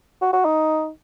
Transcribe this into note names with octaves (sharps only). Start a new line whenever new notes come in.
F#4
F#4
D#4